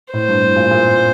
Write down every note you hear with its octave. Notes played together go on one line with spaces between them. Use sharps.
A2 C5
G2
A2
A#2
A#2